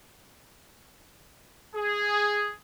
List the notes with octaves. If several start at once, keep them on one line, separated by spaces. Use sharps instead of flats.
G#4